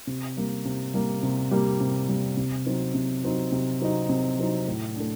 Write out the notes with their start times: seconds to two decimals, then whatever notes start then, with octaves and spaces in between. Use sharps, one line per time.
0.07 C3
0.37 G3 A#3
0.65 C3
0.94 G3 A#3
1.23 C3
1.51 G3 A#3
1.81 C3
2.09 G3 A#3
2.37 C3
2.66 F#3 C4 D#4
2.95 C3
3.23 F#3 C4 D#4
3.52 C3
3.81 F#3 C4 D#4
4.09 C3
4.38 F#3 C4 D#4
4.67 A2
4.96 A3 D4